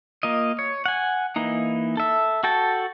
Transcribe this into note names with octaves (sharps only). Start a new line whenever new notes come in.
A#3 F4 D#5
C#5
F#5 G#5
E3 A#3 D#4
A4 E5
F#4 A4 G5 A5